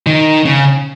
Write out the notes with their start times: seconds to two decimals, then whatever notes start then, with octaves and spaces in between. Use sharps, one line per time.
0.06 D#3
0.45 C#3